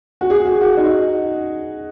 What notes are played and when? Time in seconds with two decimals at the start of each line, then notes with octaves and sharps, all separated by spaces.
0.21 F#4
0.30 G#4
0.45 F#4
0.61 F#4
0.77 D#4